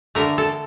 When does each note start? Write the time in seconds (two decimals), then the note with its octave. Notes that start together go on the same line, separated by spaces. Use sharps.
0.15 D3 A3 A#4
0.38 A4